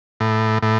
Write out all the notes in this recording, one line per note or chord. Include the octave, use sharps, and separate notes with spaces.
A2
A2